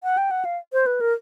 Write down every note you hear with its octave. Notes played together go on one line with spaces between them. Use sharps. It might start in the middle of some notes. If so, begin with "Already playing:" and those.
F#5
G5
F#5
F5
C5
B4
A#4